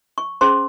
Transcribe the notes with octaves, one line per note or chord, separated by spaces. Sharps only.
C#6
C#4 G#4 C5 C6